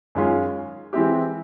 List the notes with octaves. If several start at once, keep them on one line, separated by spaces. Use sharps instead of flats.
F#2 D#3 G#3 C#4 F4
E3 G#3 C4 E4 G4